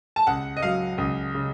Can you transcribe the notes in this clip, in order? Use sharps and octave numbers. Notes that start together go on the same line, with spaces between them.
A5
C#2 F#5
D#5
F#3 F5
C#2
C#3